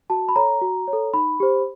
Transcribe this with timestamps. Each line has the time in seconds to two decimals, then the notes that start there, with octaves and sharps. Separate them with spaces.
0.10 F#4 A5
0.29 B5
0.36 A4 C#5 A#5
0.62 F#4
0.88 C#5
0.93 A4
1.14 D#4 B5
1.40 G4 C5